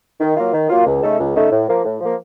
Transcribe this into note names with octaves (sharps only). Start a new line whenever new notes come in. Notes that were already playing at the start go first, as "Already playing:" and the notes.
D#3
F#3 A#3 F4
D#3
F#3 A#3 F4
C#2
C#3 A3 D#4 A4
C#2
C#3 A3 D#4 A4
A2
F3 A#3
A2
F3 A#3